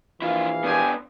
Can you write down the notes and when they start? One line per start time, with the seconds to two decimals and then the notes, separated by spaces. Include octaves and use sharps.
0.22 A#1 E3 E4 F4 F5
0.64 B3 C4 D4 G4 G#5